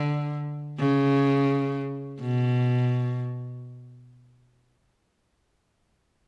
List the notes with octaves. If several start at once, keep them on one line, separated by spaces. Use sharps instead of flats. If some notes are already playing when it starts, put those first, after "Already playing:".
Already playing: D3
C#3
B2